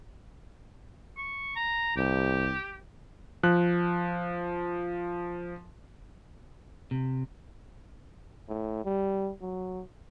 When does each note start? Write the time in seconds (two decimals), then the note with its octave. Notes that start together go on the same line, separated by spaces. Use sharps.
1.18 C#6
1.56 A#5
1.97 C2 G4
3.43 F3 F#6
6.91 C3
8.48 A2
8.85 G3
9.41 F#3